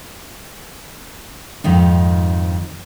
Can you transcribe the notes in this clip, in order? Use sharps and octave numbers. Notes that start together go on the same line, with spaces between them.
F2 G#2 D#3 D#4